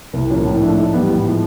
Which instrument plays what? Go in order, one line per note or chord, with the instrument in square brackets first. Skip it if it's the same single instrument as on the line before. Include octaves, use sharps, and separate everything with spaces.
[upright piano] C2
A#2 F3 A#3 C#4
A2
F3 A3 D4
G#2
E3 G3 B3
A2
F3 G#3